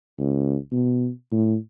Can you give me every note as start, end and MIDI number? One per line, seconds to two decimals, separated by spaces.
0.19 0.56 37
0.72 1.09 47
1.32 1.56 45